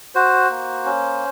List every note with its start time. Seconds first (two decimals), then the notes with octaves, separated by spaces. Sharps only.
0.15 F#4 C5
0.50 A#3
0.85 C#4